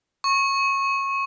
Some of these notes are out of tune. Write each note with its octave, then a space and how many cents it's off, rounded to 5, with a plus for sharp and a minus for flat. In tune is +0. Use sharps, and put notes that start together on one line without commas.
C#6 -20